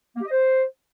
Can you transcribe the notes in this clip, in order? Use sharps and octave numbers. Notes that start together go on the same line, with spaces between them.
A#3
G4
D#5
C5